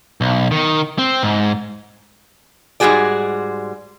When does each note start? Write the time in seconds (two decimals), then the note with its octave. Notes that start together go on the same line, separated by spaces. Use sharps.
0.21 B1
0.51 D#3
0.98 C4
1.23 G#2
2.80 G#2 G3 G#3 F#4 G#4 D5